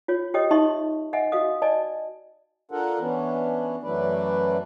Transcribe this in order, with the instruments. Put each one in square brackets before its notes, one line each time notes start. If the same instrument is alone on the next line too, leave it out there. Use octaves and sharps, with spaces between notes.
[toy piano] F4 C#5
G4 C#5 D#5 G5 D#6
D#4 D#5 E5 A5 C6 C#6
D#5 E5 F#5 G#5
F#4 D#5 F5 D#6
D5 D#5 G#5 A5
[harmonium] D4 F4 A4 A#4 F#5
E3 B3 C#4 D4
F#2 E3 F#3 A3 B4 D5